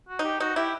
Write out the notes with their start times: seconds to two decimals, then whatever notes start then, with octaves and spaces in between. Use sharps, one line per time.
0.09 F#4
0.19 D#4
0.24 G4
0.40 D#4 F#4
0.56 E4 G4